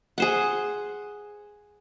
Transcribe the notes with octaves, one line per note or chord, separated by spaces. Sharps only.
G#4 C5 F#5